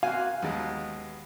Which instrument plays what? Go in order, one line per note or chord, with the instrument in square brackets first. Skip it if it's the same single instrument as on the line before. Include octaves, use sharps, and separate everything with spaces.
[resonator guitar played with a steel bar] A#3 C4 F#4 [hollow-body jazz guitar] F5 [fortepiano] G#5
[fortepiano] D#2 F#3 G#3 [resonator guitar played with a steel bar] B3